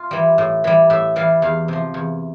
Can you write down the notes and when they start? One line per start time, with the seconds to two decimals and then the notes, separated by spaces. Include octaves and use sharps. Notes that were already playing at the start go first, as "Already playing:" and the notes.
Already playing: F4
0.11 E3 G3
0.38 A2
0.64 E3 G3
0.90 A2 E5
1.16 E3 G3 F5
1.42 E2 F5
1.68 C3 F3
1.94 E2